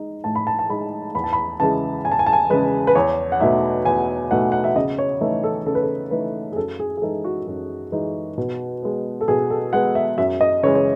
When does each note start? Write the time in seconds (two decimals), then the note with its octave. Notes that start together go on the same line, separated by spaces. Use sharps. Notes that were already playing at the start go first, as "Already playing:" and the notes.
Already playing: G#3 D#4
0.24 A2 A5
0.35 B5
0.47 A5
0.59 A5
0.69 G#3 D#4 B5
1.15 E2 B5
1.24 A5
1.33 B5
1.60 C#3 E3 G#3 A5
2.05 E2 G#5
2.12 A5
2.19 G#5
2.26 A5
2.33 G#5
2.50 C#3 E3 G#3 B4
2.87 B4
2.95 E2 C#5
3.32 F#5
3.40 B2 A3 D#4 E5
3.85 E2 G#5
4.31 B2 A3 D#4 F#5
4.52 F#5
4.64 E5
4.76 C#3 D#5
4.98 C#5
5.21 E3 A3 D#4 A4
5.43 A4
5.66 C#3 A4
5.75 B4
5.83 A4
6.11 E3 A3 D#4 B4
6.52 G#4
6.56 F#2 A4
6.80 G#4
6.97 G#4
7.02 E3 G#3 D#4 A4
7.24 F#4
7.47 F#2
7.92 E3 G#3 D#4
8.38 B2
8.83 G#3 B3
9.21 A4
9.28 B2 G#4
9.50 A4
9.73 G#3 B3 F#5
9.95 E5
10.18 F#2 E5
10.41 D#5
10.63 C#3 E3 G#3 C#5
10.75 C#5